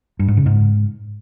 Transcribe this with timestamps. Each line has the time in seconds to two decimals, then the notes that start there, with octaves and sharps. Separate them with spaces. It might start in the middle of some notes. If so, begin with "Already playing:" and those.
0.19 G2
0.28 G#2
0.37 C#3
0.46 G#2